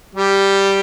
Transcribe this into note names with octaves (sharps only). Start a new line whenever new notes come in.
G3 G4